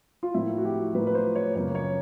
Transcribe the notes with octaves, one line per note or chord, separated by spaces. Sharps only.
F4
A2 F3 A#3 E4
F#4
G4
A2 F3 A#3 B4
B4
C5
C#5
F#2 C#3 F3 A#3 C#5
C#5